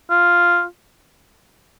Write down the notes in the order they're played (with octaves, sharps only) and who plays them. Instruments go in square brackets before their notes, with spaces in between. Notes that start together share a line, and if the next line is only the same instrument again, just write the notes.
[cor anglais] F4